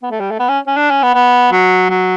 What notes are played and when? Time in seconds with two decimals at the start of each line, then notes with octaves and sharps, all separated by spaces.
0.03 B3
0.11 A3
0.20 G3
0.31 A3
0.40 B3
0.49 C#4
0.67 C#4
0.77 D4
0.90 C#4
1.03 B3
1.15 B3
1.52 F#3
1.90 F#3